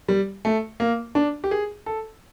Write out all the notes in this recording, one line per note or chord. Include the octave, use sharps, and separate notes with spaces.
G3
A3
A#3
D4
G4
G#4
A4